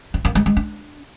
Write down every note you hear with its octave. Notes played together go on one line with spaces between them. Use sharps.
E4
A#3
G#3
G#3
D4